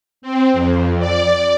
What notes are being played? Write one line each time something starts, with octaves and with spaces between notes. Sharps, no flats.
C4
F2
D5